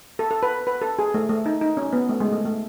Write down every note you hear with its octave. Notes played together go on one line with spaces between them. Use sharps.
A4
A4
B4
B4
A4
G#4
A3
A3
D#4
D#4
C#4
B3
A3
G#3
A3
A3